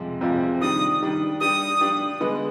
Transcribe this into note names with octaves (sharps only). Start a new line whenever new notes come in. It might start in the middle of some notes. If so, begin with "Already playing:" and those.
Already playing: F2 C3 F3 G#3
F2 C3 F3 G#3
D#3 G3 D4 D#6
D#3 G3 D4
G3 D4 G4 D#6
G3 D4 G4
D3 G#3 B3